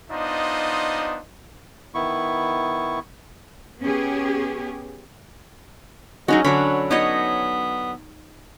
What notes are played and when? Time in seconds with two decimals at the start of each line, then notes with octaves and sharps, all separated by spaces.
0.11 B3 D4 D#4 F4 C5 D#5
1.94 D#3 B3 E4 C#6
3.80 B3 C#4 G4 G#4
6.28 F#3 G#3 C#4 D#4 F#4
6.44 D3 F#3 D4 C#5 B5
6.91 B3 D#4 C#5 D#5